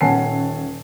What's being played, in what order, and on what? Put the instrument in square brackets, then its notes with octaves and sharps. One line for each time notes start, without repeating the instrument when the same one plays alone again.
[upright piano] D#1 C#4 F#5 G#5 A5 C7